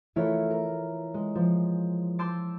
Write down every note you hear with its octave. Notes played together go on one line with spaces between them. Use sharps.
E3 A3 E4 F4 A#4 C#5
A#4
G#3
F3
A5 C6 D6 E6 G6